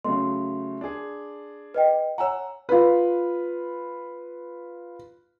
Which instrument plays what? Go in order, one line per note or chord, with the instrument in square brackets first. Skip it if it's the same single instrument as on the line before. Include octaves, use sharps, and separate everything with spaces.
[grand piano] C#3 F#3 A3 [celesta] C6
[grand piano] D4 G#4
[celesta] B4 D#5 G5
[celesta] C#5 G#5 A#5 [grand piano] F#5 E6
[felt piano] F4 B4